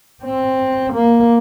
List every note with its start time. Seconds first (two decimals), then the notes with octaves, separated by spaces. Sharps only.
0.24 C4
0.94 A#3